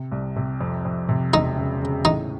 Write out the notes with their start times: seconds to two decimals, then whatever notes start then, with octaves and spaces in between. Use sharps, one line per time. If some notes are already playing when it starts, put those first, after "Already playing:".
Already playing: C3
0.12 C2
0.36 C3
0.61 F2
0.85 F2
1.09 C3
1.33 E1 D#4
1.57 C#3
1.82 C#3
2.05 A2 D#4